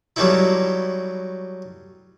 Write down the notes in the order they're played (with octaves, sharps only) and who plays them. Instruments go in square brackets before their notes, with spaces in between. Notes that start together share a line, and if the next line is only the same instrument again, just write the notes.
[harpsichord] F#3 G3 A3 B3 D#4 E4